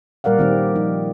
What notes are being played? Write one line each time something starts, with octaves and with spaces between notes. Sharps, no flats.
A#2 G3 A#4 D5 F5 F#5
D#3 C4 G4
F3 D#4